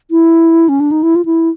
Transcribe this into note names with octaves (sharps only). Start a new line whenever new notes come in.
E4
C#4
D4
D#4
E4
F4
E4